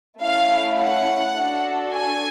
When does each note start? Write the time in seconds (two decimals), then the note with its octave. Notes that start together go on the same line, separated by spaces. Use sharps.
0.21 A3 C#4 E4 F5
0.79 F#5
1.36 D4 F#4 A4
1.93 G#5